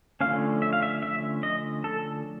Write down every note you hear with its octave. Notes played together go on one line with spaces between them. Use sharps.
D3 F3 A3 C#4 F5
E5
F5
E5
E5
D#5
A4